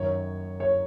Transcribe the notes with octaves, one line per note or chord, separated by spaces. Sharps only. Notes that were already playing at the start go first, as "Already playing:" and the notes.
Already playing: F#2 D#3 C#5
C#5